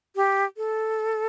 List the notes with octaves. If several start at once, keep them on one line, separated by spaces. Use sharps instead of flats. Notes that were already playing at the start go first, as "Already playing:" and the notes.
G4
A4